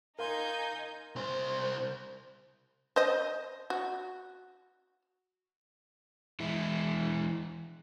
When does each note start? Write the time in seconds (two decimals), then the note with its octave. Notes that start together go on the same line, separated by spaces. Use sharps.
0.19 D#4 A#4 F5 G#5 C6 G6
1.16 C2 C5
2.96 C5 D#5
3.70 F#4
6.40 E3 G#3 E4